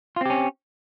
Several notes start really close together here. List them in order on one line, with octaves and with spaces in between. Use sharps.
F4 C4 G4 C#4